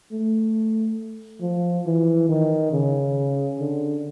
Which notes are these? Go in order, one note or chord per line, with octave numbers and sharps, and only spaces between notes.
A3
F3
E3
D#3
C#3
D3